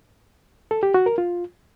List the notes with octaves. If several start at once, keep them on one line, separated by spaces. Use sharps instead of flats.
A4
G4
F#4
A#4
F4